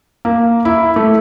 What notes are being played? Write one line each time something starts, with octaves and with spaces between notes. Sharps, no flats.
A#3
E4
A3